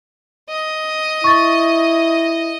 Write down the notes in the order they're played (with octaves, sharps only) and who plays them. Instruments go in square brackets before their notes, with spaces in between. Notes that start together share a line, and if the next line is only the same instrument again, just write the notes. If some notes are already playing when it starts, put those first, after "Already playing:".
[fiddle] D#5
[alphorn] E4 [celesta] C#6 A6